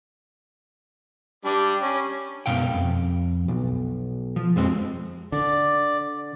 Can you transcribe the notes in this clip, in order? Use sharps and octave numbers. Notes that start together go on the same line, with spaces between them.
G3 D4
C#4
F#2 B2 F5 G5
F2
B1
F3
F2 G#3 C4
D3 D5